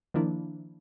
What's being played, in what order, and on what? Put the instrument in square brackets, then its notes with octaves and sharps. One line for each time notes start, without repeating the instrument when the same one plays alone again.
[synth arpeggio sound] D#3 F3 A#3 D4 E4